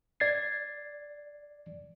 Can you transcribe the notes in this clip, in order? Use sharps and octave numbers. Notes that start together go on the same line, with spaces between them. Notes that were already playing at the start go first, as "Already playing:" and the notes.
D5 G#6 A6 C7